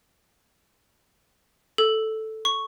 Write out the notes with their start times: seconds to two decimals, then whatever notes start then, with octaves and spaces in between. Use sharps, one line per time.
1.78 A4
2.45 C#6